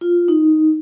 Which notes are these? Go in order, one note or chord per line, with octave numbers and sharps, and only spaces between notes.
F4
D#4